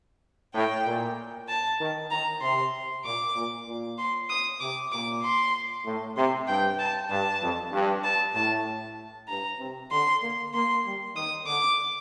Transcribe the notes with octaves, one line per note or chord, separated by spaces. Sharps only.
A2 G5
A#2
A5
D#3
D#3 A#5
C3 C6
A#2 D6
A#2
A#2
C6
D#6
C3 D6
A#2 D6
C6
A2
C3 C6
G2 G5
A5
G2 A5
F2
G2
A5
A2 A5
G2 A#5
C3
D3 C6
A#3
A#3 C6
G3
D#3 D#6
D3 D6